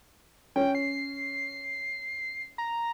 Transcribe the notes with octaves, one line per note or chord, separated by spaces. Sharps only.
C#4 G5
C7
A#5